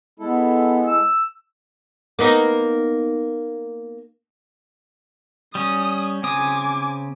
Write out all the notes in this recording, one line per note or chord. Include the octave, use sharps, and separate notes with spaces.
G#3 B3 E4 A4
E6
A#3 B3 D#4
G3 C#4 D#6
C#3 C4 G#5 D6 D#6